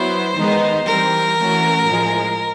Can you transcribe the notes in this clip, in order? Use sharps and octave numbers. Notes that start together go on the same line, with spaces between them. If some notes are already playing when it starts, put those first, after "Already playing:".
Already playing: F#3 B3 E4 C5
D#3 G#3 B3 D#4
E3 G3 C4 A#4
E3 A3 C#4 F#4
A2 F3 G#3